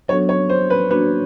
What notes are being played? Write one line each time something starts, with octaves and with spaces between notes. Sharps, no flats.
F#3 B3 D4 F#4 A4 C#5
C#5
C5
B4
A#3 D4 F#4 B4